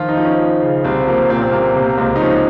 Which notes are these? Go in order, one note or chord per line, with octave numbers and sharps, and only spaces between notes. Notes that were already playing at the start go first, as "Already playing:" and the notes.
Already playing: D#3 F3 F4
D#4
F3
C#4
F3
C#3
C2 C4
F3 A#3
A#2 C4
C4
C2 A#3
C3 A#3
A#3
C#2 C4
D#4
F3 C#4